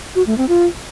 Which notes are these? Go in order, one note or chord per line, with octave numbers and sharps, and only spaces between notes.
F#4
A3
C4
F4